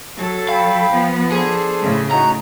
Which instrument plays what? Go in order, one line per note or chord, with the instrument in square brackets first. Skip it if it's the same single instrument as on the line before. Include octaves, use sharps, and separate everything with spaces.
[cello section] F#3 A4
[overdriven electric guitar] F5 [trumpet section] G5 B5
[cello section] F3 B3
[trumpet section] D4 A4 C5 [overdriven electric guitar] G#4
[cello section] A2 C#3
[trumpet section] D#4 F#4 [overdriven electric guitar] A#5